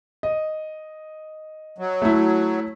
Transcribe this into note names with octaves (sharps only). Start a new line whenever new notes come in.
D#5
F#3
A3 E4